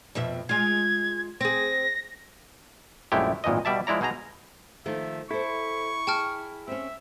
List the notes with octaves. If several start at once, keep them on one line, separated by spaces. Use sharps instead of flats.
F2 B2 E5
G#3 F4 G#6
C4 G#4 A#6
A#1 F#2 G#3 A3 E4 G4
G#1 A#2 E3 F3 D#5
B2 G3 D5 E5 A5
F3 G#3 E4 D5 A#5
B2 D#4 G#4 D#5 A#5
D#3 F3 A3 E5
E4 A4 C5 C#6
G#4 G5 A5 F6
C4 C#4 E5